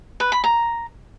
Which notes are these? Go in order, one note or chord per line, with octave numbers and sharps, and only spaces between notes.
B4
B5
A#5